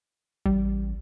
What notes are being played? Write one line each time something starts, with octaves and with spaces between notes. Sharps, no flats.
A1 G3